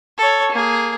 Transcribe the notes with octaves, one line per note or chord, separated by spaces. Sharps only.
A4 C#5
A#3 G#4